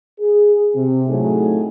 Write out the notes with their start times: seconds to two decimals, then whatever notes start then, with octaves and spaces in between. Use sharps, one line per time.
0.20 G#4
0.75 C3
1.08 A2 F#3 A3 D#4 G#4